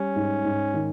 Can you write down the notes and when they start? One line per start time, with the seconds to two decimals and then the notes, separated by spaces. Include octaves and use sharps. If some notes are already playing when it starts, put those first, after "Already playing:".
Already playing: G3 C#4
0.16 G#2
0.44 G#2
0.74 D#3